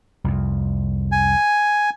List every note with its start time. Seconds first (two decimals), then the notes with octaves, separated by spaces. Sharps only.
0.24 C2 F2
1.12 G#5